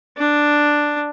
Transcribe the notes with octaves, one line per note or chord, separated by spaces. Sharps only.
D4